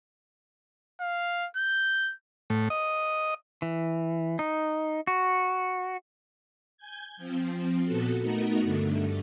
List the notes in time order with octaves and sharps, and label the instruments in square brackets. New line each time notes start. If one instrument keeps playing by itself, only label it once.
[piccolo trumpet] F5
G6
[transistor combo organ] A2
D#5
[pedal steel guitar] E3
D#4
F#4
[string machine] G#5 G6 G#6
F3 C4
A#2 B3 F#4 A4
A3 B3 D#4 F#4 A#4
G2 D3 A3